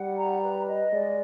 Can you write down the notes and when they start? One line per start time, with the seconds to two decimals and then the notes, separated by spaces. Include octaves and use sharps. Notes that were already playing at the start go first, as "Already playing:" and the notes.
Already playing: G3 F#5
0.17 A#5
0.42 B4
0.68 D#5
0.92 G#3 D5